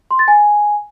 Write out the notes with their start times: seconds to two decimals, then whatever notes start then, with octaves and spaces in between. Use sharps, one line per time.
0.11 C6
0.19 A6
0.28 G#5